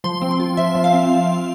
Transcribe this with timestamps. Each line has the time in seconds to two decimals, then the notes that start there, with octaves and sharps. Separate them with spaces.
0.04 F3 C6
0.22 C4
0.31 C6
0.40 F4
0.57 F3 E5
0.75 F3
0.84 F5
0.93 C4